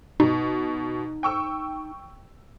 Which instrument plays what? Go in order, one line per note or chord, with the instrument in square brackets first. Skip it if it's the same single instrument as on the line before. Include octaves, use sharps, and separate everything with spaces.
[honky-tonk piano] B2 [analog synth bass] D#4
[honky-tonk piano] G5 C#6 E6